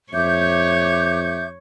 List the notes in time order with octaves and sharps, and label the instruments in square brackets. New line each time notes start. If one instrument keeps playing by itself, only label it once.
[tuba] F2 [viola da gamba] C#5 [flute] E5 [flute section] D6 G6